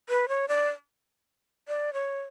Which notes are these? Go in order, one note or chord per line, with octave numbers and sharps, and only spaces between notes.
B4
C#5
D5
D5
C#5